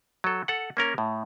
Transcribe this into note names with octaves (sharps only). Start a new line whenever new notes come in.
F#3 A4
A4 F#5
A#3 C#4 A#4
A2